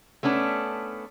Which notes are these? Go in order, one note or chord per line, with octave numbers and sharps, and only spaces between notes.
A3 B3 C#4 D4